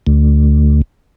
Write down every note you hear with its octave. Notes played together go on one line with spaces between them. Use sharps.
D2